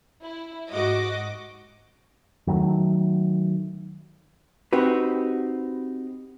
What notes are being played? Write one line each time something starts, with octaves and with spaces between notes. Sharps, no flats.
E4
G#2 F#4 D#5 D6
D#3 F#3 G3 A3
C4 D#4 F#4 G4 B4